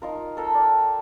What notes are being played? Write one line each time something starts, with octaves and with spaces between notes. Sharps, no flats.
D#4 F4 A#4
A4 A#4 G5
D5